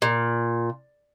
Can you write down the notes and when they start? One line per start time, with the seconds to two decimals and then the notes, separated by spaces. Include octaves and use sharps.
0.02 A#2